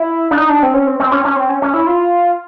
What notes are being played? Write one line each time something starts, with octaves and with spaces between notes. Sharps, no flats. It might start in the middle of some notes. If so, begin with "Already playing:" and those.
Already playing: E4
D4
D#4
D4
C4
C#4
C4
C4
C#4
C#4
C4
C#4
C#4
E4
F4